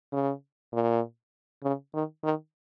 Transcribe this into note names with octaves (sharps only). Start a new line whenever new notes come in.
C#3
A#2
C#3
D#3
D#3